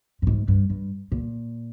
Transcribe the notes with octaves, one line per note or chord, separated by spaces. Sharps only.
G2
G#2
G2
G2
A#2